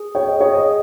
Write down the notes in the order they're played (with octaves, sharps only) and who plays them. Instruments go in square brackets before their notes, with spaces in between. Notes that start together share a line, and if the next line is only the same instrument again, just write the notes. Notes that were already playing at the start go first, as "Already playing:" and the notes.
Already playing: [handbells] G#4
[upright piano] C#5 [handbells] G5
[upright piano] D#5
[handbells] G#4 [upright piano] C#5
[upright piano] D#5
[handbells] G#4